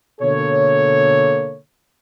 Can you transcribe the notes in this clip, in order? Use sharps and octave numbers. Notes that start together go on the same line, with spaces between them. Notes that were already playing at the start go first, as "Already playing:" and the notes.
B2 D3 A#3 A4 C#5